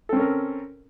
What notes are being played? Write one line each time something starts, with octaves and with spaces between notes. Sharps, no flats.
C4 C#4 A4 A#4